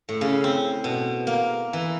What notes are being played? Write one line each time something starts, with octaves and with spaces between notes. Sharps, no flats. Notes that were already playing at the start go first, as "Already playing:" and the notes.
A2
C#3
C4
B2
A#3
E3